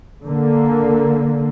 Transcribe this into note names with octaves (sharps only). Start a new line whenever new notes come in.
D3 A#3